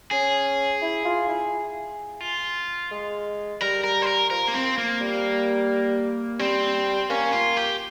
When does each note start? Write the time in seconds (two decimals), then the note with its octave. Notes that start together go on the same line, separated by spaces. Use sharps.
0.11 C#4 G#4
0.82 E4
1.05 F4
1.29 E4
2.20 F4
2.91 G#3
3.61 G3 A#4
3.84 A#4
4.02 C5
4.07 A#4
4.30 F3 A#4
4.48 A#3
4.54 C4
4.78 A#3
5.01 G3
6.39 G3 C4
7.10 A#3 C#4
7.32 F4
7.57 G4